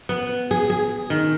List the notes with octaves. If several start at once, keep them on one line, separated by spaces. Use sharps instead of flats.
B3
G#4
G#4
D#3